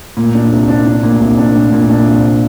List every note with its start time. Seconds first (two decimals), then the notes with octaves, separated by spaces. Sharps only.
0.17 A#2
0.35 D4
0.51 C2
0.68 D4
0.86 D4
1.03 A#2
1.20 C2
1.38 D4
1.55 A#2
1.73 A#2
1.89 D4
2.06 C2